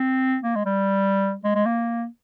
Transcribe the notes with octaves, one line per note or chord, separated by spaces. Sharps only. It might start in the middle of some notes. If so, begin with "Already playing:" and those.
Already playing: C4
A#3
G#3
G3
G#3
G#3
A#3